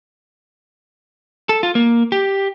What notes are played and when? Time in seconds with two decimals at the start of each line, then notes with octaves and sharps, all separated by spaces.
1.49 A4
1.63 F4
1.75 A#3
2.12 G4